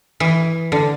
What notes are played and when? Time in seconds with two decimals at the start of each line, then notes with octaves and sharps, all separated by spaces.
0.20 E3
0.72 D3